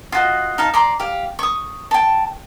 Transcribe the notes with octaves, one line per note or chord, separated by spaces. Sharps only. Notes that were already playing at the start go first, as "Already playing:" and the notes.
F4 F#4 D#5
D#4 F5 A5
D5 A#5 C6
G4 F5
C#6 D#6
G5 A5